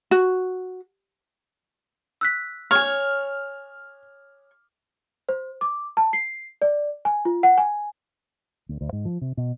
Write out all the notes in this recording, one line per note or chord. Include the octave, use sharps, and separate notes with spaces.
F#4
E6 F#6 B6
C#5 G#5 F6
C5
D6
A5
C7
D5
G#5
F4
F#5
G#5
D2
D2
G#2
F3
C3
B2